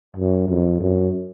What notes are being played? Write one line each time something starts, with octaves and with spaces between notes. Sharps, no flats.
F#2
F2
F#2